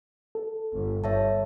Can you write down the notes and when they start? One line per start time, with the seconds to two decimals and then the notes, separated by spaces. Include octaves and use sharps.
0.35 A4
0.74 G1
1.04 G1 C#5 E5 A5